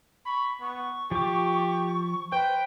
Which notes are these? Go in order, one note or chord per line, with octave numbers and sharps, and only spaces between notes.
B5 C#6
B3 C#6
F3 G4 D6
B4 C5 G5